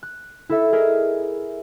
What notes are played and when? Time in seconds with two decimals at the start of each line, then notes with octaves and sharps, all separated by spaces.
0.03 F#6
0.49 E4 A4 E5
0.72 G#4 A#4 D#5 E5